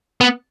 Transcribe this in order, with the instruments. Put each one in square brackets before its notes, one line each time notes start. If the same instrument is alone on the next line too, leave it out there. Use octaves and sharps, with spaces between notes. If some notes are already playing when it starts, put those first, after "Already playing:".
[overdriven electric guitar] B3